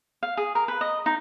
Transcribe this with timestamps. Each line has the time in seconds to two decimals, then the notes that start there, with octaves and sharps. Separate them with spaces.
0.23 F5
0.37 G#4
0.55 A#4
0.68 B4
0.81 D#5
1.06 D#4